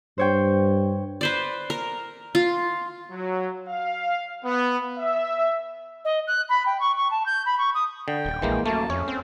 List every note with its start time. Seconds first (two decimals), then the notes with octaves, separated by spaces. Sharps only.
0.18 G2 C5 C#5 G5
1.21 B4 C5 D5
1.70 A#4
2.35 F4
3.11 F#3
3.68 F5
4.45 B3
4.98 E5
6.04 D#5
6.27 F#6
6.49 B5
6.66 G5
6.80 C#6
6.96 C#6
7.11 A5
7.26 G6
7.45 B5
7.58 C#6
7.74 D#6
8.08 D3 G5
8.25 D#1
8.42 A#1 E3 G#3 A#3
8.66 F#2 A3 A#3 A5
8.90 F2 C#4 C#5
9.08 C4